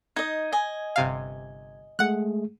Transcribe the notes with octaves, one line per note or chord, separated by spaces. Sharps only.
D#4 D#5 G#6
D#5 G#5
G1 C3 F5
G#3 A3 G#4 F#5 F#6